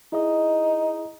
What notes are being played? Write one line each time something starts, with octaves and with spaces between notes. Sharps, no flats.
D#4 E4 G#4 D#5